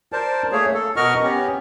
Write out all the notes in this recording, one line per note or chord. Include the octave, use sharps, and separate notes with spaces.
A#4 C5 D5 A5
A3 A#3 G#4 C#5
A4
B2 F#4 A#4 D#5 C#6 F6
B3 C#4 G4